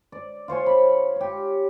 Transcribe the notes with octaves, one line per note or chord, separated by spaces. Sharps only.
D5
F4 C5 C#5 G#5
B5
G4 C#5